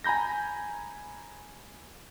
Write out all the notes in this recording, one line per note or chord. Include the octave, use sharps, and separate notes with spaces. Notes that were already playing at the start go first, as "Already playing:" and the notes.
G#5 A#5 B5 G6 A#6